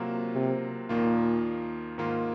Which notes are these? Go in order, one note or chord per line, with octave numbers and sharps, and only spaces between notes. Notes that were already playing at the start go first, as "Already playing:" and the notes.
Already playing: C3 F#3 A#3 F4
C3
D#2 A#2 D#3 A#3 F4
G#2 D#3 A#3 F4